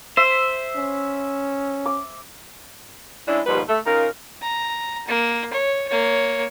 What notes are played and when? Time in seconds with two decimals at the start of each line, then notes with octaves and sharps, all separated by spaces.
0.17 C5 E5
0.76 C#4
1.86 D6
3.28 G#3 C#4 D4 E4
3.47 D#2 G#2 B2 F3 G3 B4
3.68 A3
3.86 C#3 D#4 F4 A#4
4.41 A#5
5.08 A#3
5.53 C#5
5.88 A#3 C#5